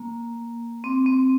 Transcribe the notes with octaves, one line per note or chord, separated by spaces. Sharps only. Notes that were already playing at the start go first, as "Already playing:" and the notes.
Already playing: A#3
C4
C4